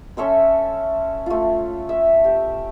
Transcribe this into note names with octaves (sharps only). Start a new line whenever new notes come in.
C#4 A4 E5 C6
A3 F4
E5
G4